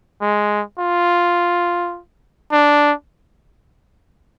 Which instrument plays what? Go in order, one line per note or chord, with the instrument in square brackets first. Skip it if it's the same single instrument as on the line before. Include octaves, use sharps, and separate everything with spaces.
[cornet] G#3
F4
D4